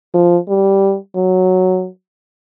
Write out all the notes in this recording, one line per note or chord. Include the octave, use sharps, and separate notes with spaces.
F3
G3
F#3